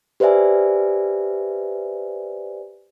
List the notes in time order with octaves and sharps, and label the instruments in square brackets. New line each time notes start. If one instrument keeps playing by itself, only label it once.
[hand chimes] G4 B4 C5 D5 E5 G#5